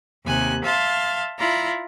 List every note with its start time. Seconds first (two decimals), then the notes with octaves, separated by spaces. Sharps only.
0.24 D#2 C3 G#5 F#6
0.64 E5 F5 A5 C6
1.39 E4 F4 D5 A#5